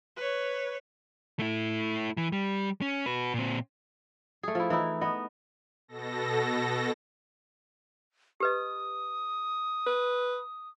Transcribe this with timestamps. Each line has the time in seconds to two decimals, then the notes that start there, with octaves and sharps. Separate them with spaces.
0.17 B4 C#5
1.39 A3 E4
2.17 E3
2.32 G3
2.81 C#4
3.06 F#4 B4
3.34 A#2 C4
4.43 A3 G#4
4.55 F3 E4
4.70 E3 D#4 E4
5.01 B3 D#5
5.88 B2 A4 A#6
8.40 G4 B4 D#5 D#6
9.86 B4